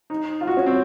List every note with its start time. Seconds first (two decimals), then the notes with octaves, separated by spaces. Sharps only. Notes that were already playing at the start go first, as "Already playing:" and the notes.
0.10 D#4
0.41 F4
0.47 F#4
0.57 C#4
0.66 C4